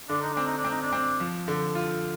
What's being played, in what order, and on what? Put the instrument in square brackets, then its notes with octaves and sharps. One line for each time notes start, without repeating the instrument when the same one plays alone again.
[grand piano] D3 [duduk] D4
[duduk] D#4
[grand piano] C4 [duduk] D4
[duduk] D#4
D4
[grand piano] C4
[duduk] D#4
D4
[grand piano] C4
F3
D3
F4